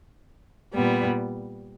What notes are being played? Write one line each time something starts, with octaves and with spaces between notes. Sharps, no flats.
A#2 G3 B3